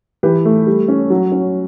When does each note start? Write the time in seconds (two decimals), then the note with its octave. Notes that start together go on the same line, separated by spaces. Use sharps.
0.23 E3 G4 B4
0.45 A3
0.67 G3
0.88 C#4
1.10 F#3
1.32 C#4